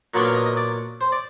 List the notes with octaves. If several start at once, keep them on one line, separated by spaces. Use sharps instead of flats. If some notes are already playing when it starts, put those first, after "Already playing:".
A#2 F#3 B3 D4
F5
D#5
D#5
D5
C5
D5